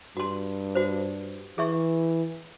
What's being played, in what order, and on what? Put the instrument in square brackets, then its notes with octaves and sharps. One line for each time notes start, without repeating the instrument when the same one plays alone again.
[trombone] G2 [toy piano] F#4 C6
[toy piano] F#4 C5
[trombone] E3 [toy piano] G#4 E5 C#6